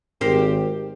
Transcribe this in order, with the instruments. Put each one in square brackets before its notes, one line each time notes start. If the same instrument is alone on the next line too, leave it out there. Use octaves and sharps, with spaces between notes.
[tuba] G#1 [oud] G4 A#4 C5